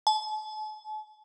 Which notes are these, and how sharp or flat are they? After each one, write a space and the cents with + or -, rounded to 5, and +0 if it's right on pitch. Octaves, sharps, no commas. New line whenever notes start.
A5 -40